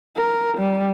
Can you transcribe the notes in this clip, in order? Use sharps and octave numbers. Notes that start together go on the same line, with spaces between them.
A#4
G3